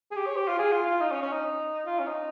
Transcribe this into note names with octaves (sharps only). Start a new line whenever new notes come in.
G#4
G4
C#5
G4
F4
G#4
F4
F4
D#4
C#4
C#4
D#4
F4
C#4
D#4